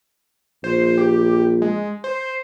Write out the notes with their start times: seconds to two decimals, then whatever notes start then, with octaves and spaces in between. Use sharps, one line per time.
0.64 A#1 C5
0.98 G4
1.62 G#3
2.04 C5